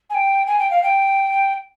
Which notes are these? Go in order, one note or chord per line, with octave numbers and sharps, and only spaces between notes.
G#5
G5
G#5
G5
F5
G5